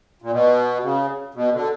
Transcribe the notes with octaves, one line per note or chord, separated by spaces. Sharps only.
A#2
B2
C#3
B2
D3